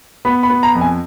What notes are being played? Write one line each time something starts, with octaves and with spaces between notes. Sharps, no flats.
B3 B5
B5
B3
A#5
F2
G#5